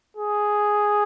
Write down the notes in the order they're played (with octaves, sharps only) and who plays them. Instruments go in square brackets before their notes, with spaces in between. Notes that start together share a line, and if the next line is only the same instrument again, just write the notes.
[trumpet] G#4